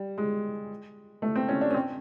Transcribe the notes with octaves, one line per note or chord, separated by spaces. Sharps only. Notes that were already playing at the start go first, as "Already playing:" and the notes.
Already playing: G3
G#3
A3
C4
C#4
D4
C#4
C4